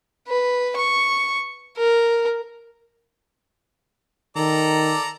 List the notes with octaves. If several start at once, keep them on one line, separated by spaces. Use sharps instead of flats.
B4
C#6
A#4
D#3 A4 D5 A#5